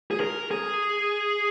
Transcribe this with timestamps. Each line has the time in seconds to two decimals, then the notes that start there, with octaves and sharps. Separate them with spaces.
0.11 G#4
0.20 A#4
0.51 G#4